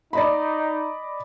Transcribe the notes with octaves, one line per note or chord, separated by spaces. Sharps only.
D#4 D5 D#5 B5